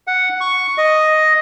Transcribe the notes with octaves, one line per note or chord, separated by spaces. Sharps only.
F#5
C#6
D#5